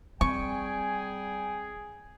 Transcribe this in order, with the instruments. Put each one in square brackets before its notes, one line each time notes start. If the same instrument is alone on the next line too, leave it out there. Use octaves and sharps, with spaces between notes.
[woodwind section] G3 G5 G#5 [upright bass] C4 [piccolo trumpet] G#4 [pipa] C#6